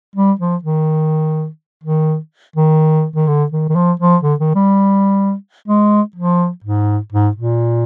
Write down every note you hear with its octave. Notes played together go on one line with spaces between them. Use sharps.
G3
F3
D#3
D#3
D#3
D#3
D3
D#3
D#3
F3
F3
D3
D#3
G3
G#3
F3
G#2
G#2
A#2